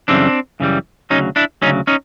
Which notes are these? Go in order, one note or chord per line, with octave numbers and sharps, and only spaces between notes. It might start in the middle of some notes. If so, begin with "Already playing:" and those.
F#2 C#3 E3 G3 C4 D4
F#2 C#3 E3 G3
D2 C#3 F#3 C#4 D#4
D4 E4
D2 C#3 F#3 C#4 D#4
C#4 D#4